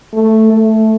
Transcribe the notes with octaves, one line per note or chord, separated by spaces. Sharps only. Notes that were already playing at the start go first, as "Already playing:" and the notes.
A3
A3